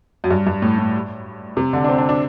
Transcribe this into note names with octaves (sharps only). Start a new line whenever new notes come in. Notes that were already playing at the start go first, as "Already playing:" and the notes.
F#2
G2
G2
A2
A2
C3
D3
D4
C4
D4
D4